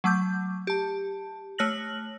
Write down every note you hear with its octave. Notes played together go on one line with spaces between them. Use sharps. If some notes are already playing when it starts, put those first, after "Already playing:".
F#3 A3 D6 G6
G4 A5
A3 C#5 F6 F#6 A#6 F#7